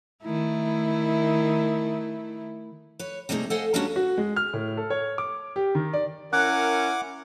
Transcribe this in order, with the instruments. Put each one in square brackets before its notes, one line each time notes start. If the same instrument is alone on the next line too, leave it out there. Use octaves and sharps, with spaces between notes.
[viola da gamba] D#3 A3 E4
[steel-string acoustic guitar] B4 C#5
C3 G3 A3 A#3 D#4 G#4
A4 C5 D#5 F5 F#5 G#5
G3 G#3 A#3 C#4 D4 F#4
[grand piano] F#4
G#3
F6
A2
A4
C#5
D6
G4
D#3
D5
[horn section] C#4 E4 A#4 [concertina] F#5 D6 [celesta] F#6